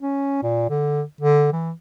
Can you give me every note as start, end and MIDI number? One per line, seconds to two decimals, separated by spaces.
0.01 0.40 61
0.42 0.68 46
0.70 1.02 50
1.21 1.48 50
1.53 1.71 52